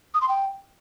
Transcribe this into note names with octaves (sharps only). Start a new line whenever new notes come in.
D#6
C6
G5